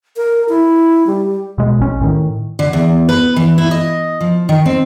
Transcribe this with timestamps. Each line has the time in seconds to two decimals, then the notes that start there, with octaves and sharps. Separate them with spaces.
0.17 A#4
0.49 E4
1.07 G3
1.58 B2 G#3
1.79 A#1 C#4
2.01 A2 D#3
2.59 D3
2.73 E2
3.09 B4
3.36 E3
3.58 E4
3.71 D#5
4.21 F3
4.49 D#3
4.66 C4